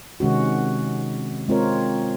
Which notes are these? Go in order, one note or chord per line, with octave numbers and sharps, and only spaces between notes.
C3 D#3 G#3 C#4 F#4
G#3 C4 F4 A#4 C#5